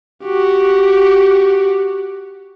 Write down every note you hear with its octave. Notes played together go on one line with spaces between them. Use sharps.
F#4 G4